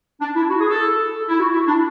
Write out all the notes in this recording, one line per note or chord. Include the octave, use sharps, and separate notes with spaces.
D4
E4
F#4
G#4
A4
E4
F#4
E4
D4